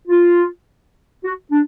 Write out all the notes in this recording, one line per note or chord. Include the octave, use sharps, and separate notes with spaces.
F4
F#4
D4